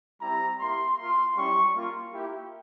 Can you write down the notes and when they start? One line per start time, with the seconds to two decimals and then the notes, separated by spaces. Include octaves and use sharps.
0.21 G3 C4 E4 G4 A#5
0.59 A#3 E4 G4 C6
0.98 A#3 F4 C6
1.36 G3 C#4 E4 G4 C#6
1.75 A#3 F4
2.12 A#3 E4 G4